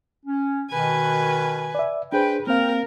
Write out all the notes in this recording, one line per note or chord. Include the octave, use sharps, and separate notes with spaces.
C#4
B2 D#3 B4 G#5
D5 E5
D4 G#4 B4 C5 G5
A#3 C4 A#4 F5 G5 F6